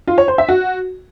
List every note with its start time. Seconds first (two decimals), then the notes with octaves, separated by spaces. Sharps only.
0.07 F4
0.18 C#5
0.28 C5
0.38 E5
0.49 F#4